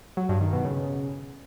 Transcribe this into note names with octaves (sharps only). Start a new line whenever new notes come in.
F#3
G2
D#3
B2
C#3